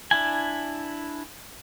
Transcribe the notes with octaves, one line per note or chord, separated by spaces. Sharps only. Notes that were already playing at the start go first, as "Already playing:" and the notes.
D4 E4 G#5